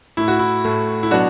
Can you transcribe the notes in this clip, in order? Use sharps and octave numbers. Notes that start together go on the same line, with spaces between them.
A2 A3 E4
F#4
E4
A2 A3
E4
B2 F#3 B3 D4 F#4